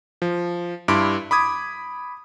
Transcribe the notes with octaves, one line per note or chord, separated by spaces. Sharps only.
F3
G2 E4 C6 D6 D7
B5 D6 D#6 G#6